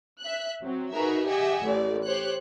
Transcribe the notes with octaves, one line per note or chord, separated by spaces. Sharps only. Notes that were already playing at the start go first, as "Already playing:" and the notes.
E5 F#6
F#3 C4
D#4 F#4 G#4 A#4 B4 E5
G4 G#4 D#5 E5 F#5 G#5
A1 D5
G4 C5 C#5 F#6